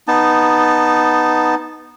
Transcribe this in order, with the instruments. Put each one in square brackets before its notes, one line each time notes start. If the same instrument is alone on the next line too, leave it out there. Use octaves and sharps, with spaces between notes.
[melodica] B3 D#4 A5